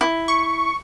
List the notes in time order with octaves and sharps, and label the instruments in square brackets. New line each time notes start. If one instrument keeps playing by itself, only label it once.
[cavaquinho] E4
[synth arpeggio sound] C#6